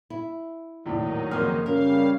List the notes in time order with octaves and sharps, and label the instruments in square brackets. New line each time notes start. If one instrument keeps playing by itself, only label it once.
[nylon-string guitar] E4
[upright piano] A#1 E2 A2 [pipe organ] D#3 F#3 D#4
[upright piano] F#1 A#3 F6 [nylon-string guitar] F3
[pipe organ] C#3 G3 F5 [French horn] C#4 [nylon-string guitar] A#4